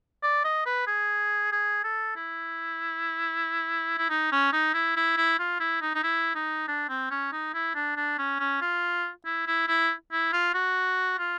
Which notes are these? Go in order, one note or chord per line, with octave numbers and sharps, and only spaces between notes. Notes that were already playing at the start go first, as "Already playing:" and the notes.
D5
D#5
B4
G#4
G#4
A4
E4
E4
D#4
C#4
D#4
E4
E4
E4
F4
E4
D#4
D#4
E4
D#4
D4
C4
C#4
D#4
E4
D4
D4
C#4
C#4
F4
E4
E4
E4
E4
F4
F#4
F4